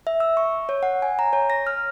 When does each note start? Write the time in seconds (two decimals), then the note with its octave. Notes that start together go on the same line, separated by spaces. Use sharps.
0.07 E5
0.20 E6
0.37 C#6
0.69 C#5
0.83 F#5
1.02 G#5
1.19 A#5
1.33 C#5
1.50 A#6
1.67 F6